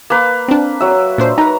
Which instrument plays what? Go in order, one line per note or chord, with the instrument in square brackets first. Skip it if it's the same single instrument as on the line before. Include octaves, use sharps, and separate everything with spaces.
[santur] A#3 B4
[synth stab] C4 D4
[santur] F#3 E5
[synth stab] A#2 D4 C5
[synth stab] D#4 B4 [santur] A#5